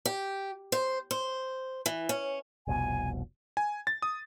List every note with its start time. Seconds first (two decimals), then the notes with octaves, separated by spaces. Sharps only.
0.05 G4
0.72 C5
1.11 C5
1.86 E3
2.09 C#4
2.67 F1 C2 B2 G#5
3.57 G#5
3.87 A6
4.02 D#6